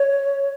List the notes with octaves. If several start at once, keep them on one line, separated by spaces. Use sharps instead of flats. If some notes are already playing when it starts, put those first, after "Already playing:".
Already playing: C#5